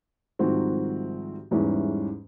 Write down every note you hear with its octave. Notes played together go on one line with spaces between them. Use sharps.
C2 G#2 D#3 F3 C4 F#4
E2 G#2 E3 G3 C#4 E4